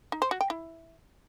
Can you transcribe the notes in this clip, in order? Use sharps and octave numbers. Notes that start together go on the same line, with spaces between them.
D#4
C5
F#4
G5
E4